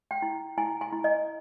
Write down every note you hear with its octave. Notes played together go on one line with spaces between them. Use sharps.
G5
E4
E4 G#5
G#5
E4
D#5